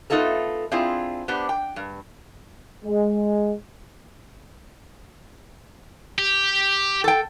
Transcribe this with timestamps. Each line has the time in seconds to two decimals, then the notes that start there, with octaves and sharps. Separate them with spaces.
0.10 A3 B3 D#4 F4 A4 A#4
0.72 C4 D4 E4 F4 G#4 C5
1.28 B3 D4 G4 C5
1.49 G5
1.76 G2
2.85 G#3
6.19 G4
7.04 A4 G5